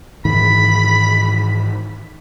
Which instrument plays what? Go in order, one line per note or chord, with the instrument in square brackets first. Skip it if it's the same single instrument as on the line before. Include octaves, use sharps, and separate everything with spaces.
[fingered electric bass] G#2 D#3 E3 [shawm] B5